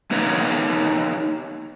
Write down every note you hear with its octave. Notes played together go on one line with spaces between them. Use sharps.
A#3 D#4 B4 C#5